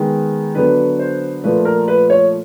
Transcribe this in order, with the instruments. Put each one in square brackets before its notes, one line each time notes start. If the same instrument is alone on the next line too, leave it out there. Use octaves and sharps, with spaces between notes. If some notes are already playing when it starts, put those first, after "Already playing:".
Already playing: [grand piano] D#3 G#3 B3
D3 F#3 B3 B4
C5
A#2 F3 A3 B4
A#4
B4
C#5